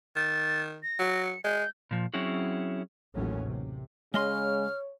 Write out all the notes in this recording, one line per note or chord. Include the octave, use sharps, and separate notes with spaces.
D#3 A6
A#6
F#3
C#7
G#3 G6
A#2 F3
F#3 C4 C#4 E4 F#4 G#4
A1 D#2 A2 F#3 C#4
C3
C#3 G#3 C#5 D#5 C6 F6